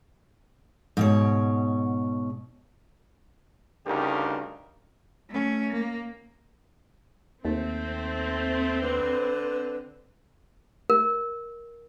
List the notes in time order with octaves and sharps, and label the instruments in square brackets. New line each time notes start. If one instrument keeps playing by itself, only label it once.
[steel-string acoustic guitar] G#2 B2 C#5
[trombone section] D2 G2 C#3 D#4 G4 A#4
[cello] A3 C#4
A#3
[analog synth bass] D#2 [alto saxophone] A3 [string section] C4
[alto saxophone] D3 [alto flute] B4
[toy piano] A#4